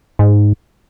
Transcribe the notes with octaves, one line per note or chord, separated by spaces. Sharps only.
G#2